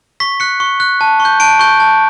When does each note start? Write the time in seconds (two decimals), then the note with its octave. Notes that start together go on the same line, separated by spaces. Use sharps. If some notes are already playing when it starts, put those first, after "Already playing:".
0.20 C#6 B6
0.40 F#6 C#7
0.60 C#6
0.80 F#6
1.01 A5
1.20 C#6
1.25 G6
1.40 A5 D7
1.59 C#6 G6
1.80 A5